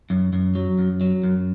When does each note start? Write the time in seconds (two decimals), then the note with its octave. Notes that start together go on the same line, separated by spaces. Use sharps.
0.10 F#2
0.33 F#2
0.55 F#3
0.79 F#2
1.01 F#3
1.23 F#2